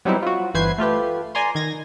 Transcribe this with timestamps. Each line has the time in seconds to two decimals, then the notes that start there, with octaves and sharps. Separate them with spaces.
0.05 F#3 G3 B3 C4 D#4 E4
0.22 F4 F#4
0.54 G1 E3 B4 C5 G#6 C7
0.78 A3 F4 G4 B4
1.35 D5 G#5 A#5 C6
1.55 D#3 G#6 A#6